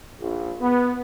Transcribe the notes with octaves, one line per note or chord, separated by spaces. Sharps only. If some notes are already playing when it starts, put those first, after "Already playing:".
A#1
B3